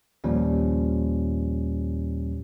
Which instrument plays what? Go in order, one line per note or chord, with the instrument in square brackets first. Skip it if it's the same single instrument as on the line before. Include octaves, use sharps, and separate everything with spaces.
[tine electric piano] D#2 A#2 F3 G3 C#4